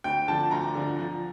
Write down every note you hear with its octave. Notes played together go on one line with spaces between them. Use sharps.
D2 G5
D3 F3 A5
D2 A#5
D3 F3
F3